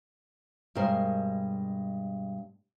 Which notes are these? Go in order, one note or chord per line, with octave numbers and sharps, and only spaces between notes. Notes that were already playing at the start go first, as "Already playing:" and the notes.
G2 B2 G3 G#3 A#4 C5